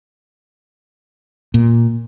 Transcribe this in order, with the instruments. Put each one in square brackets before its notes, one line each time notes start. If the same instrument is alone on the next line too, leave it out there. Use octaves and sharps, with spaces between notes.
[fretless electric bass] A#2